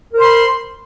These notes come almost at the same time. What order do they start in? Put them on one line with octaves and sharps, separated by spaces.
A#4 C5 C6 B5